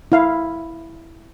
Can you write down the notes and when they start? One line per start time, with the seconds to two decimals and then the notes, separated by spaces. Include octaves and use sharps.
0.12 E4 F5